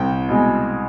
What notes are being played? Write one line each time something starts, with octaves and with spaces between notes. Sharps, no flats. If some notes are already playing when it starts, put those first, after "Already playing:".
Already playing: C2 G5
B2 G#3